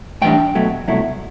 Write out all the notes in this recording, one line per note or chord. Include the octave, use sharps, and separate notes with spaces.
A2 E3 G3 D4 G5
B2 F#3 A3
C2 B2 F#3 A3 E4